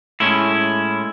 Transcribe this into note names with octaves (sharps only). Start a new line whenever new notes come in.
A2 G#3 C#4 E4